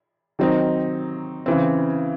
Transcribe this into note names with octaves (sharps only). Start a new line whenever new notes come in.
D#3 F#3 C4 D#4
C#3 E3 C4